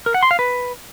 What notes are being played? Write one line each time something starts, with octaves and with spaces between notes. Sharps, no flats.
A#4
F#5
C6
F5
B4